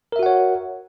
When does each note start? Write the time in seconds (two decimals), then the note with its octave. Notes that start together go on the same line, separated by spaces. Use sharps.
0.12 A#4
0.16 E5
0.19 F#4
0.23 F#5
0.26 C#5